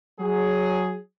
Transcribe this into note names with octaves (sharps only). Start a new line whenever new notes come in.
F#3 G#4